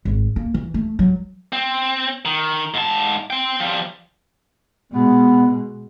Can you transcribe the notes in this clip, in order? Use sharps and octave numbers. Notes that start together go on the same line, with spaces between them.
G#1
A#3
E3
A3
F#3
C4
D#3
G#2 A5
C5 G5
F3 G3
B2 G#3 B3